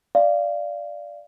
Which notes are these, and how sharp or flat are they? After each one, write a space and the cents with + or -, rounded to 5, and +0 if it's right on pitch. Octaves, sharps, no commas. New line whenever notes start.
D5 +0 F5 -20